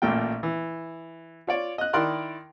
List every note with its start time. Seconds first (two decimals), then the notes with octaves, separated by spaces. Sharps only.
0.02 A1 A#2 A3 A#3 G5
0.43 E3
1.47 F4 C#5 D5
1.78 D#5 F#6
1.93 D#3 E4 A#4 D5 C6 F#6